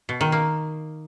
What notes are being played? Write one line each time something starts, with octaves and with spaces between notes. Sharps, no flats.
B2
D#3
A#3